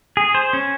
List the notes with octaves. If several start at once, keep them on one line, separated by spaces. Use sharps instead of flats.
G#4
C5
C#4